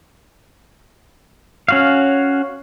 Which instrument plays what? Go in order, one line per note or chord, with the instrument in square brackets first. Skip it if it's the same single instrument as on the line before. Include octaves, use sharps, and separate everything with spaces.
[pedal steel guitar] C#4 F#4 F5